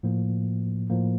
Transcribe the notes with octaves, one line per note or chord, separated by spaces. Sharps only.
A2 F3 A#3
A2 F3 A#3